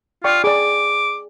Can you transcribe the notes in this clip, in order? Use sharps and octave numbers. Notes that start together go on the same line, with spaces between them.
F4 D5 G5 C#6
G#4 D5 D6